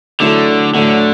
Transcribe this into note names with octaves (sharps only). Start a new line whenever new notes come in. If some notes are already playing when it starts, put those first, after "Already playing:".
D3 F#3 A3 E4 A4
A2 D3 F#3 A3